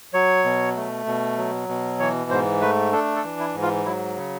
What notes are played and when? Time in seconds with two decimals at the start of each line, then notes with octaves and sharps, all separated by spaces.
0.14 F#3 C#5
0.45 B2
0.76 A3
1.06 B2
1.37 F#3
1.69 B2
2.00 E3 C#5
2.31 G#2 C5
2.61 A3 B4
2.92 D4 A4
3.16 A4
3.24 E3
3.39 E4
3.54 G#2
3.62 F4
3.85 F#3 E4
4.17 C#3